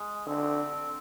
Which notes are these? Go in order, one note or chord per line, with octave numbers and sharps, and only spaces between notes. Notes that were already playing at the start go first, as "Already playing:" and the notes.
Already playing: G#3
D3 C4